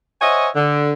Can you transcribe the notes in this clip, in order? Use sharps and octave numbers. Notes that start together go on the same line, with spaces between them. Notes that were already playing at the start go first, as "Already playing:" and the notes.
C5 C#5 D#5 E5 F#5 G#5
D3